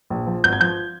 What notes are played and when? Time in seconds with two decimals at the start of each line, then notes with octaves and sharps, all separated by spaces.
0.10 A#1
0.27 F3
0.44 G#1 G6
0.53 G#6
0.60 F3 G6